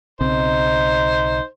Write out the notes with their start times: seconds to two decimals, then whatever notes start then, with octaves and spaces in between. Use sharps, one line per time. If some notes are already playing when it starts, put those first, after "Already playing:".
0.21 B1 C#3 C4 D#4 C5